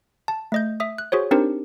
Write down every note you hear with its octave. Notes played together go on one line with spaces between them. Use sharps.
A5
A3 D#5 G6
E5 D#6
F#6
F#4 G#4 C5 C#5
C4 D4 D#4 G4 A#4 C5